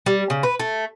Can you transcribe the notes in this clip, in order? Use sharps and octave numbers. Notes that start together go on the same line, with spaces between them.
G3
C#3
B4
A3